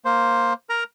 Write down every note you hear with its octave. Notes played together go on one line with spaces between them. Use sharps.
A#3 C5
A#4 A#5